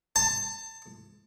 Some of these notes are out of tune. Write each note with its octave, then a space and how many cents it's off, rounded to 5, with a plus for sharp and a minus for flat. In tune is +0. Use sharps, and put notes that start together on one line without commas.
A5 +25